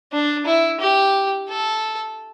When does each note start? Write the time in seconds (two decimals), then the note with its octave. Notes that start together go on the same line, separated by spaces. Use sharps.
0.13 D4
0.46 E4
0.80 G4
1.49 A4